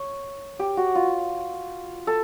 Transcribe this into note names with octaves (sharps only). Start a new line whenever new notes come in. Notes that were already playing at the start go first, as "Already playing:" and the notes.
Already playing: C#5
G4
F#4
F4
A4